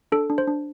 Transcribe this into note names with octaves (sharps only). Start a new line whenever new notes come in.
D4 A4
D4
C5
D4